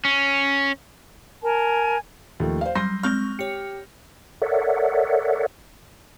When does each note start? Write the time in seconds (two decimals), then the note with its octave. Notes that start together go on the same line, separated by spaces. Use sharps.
0.05 C#4
1.42 A#4 G#5 A5
2.40 D#2 F3 A3
2.61 C5 F5
2.75 F#3 G3 C6 G6 A#6
3.03 G#3 C4 C#6 F6 G6
3.39 G4 C#5 C#7
4.42 A4 A#4 C#5 D5 E5 F#5